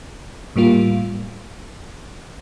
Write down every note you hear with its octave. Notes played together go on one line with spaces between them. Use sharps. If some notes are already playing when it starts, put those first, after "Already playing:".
A2 G3 A#3 F4